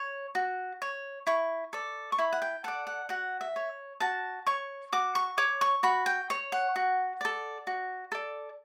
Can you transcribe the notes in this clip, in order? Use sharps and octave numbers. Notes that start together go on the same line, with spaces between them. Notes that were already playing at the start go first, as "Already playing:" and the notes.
Already playing: C#5
F#4
C#5
E4 C#6
A4 D5
C#6
E4 B5
F#5
G5
A4 D5 F#5
F#5
F#4 F#5
E5
C#5
F#4 A5
C#5 C#6
F#4 D6
C#6
C#5 D6
C#6
F#4 B5
G5
C#5
F#5
F#4
A4 D5
F#4
A4 D5